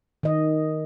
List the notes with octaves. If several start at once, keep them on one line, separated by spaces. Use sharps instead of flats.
D#3 D#5